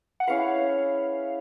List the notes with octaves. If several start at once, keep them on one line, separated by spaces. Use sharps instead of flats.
F#5
C#4 E4 G#4 B4 F5